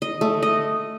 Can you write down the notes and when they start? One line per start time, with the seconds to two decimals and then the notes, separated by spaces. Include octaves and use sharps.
0.02 D#5
0.21 A3
0.42 D#5